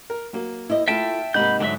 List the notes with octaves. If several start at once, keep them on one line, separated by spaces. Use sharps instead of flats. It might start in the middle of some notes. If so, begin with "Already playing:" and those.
A#4
F#3 A#3
E4 C5 D#5
A3 E4 F4 E5 G5 A5
G#2 C3 A#3 D#4 F#5 B5 G6
G#2 D3 F#3 E5